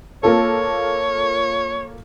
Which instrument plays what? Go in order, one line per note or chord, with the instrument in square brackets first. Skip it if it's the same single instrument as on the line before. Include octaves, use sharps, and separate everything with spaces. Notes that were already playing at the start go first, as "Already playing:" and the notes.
[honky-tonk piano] A#3 F4 A4 [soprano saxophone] C#5